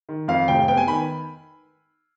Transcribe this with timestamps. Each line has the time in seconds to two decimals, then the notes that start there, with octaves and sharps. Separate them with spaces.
0.09 D#3
0.28 F2 F5
0.48 F1 G5
0.68 B3 G5
0.77 G#5
0.87 D#3 B5